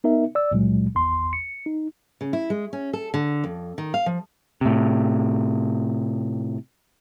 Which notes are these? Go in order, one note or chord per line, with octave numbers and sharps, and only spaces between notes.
B3 D#4 A#4 E5
D5 E6
C#2 A#2 F#3 G#3
G#1 E2 C6
C#7
D#4
C#3
E4
G#3
C#4
A4
D3
F2
D#3
F5
F3
A2 C3